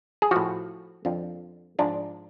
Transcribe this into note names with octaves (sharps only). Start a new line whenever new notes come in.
G#4
A2 F3 F#4
F2 D3 F3
G#2 F3 D4